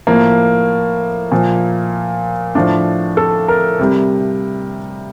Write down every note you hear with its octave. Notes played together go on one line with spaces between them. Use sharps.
A2 F3 A#3
A#2 F3
A2 F3 D4
A4
A#4
C3 G3